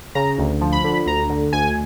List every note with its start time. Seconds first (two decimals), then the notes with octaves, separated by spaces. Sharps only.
0.15 C#3 A#5
0.38 D2
0.61 F3
0.72 B5
0.84 D3
1.06 D2 A#5
1.30 D3
1.53 D2 G#5